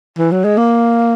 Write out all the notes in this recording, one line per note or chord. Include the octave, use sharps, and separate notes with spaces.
E3
F#3
G#3
A#3